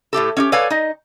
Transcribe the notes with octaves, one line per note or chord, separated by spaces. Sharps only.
A2 A3 G4 A4
C#4 D#4 G4
A4 B4 C#5 D5 F5 G#5
D#4 D#5